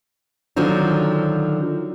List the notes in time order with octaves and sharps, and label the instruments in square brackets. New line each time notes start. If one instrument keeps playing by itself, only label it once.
[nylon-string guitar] D3 D#3 F3 F#3